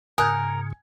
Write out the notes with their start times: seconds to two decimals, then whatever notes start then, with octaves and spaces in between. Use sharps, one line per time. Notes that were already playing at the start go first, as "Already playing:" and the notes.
0.18 G#2 C#3 A#4 G#5 D#6 F#6 G6